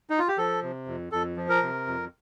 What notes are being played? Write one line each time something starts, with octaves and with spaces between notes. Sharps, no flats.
D#4
F4
G4
F3 A4
C3
F2
F2 A4
F3
A#4
C3
F2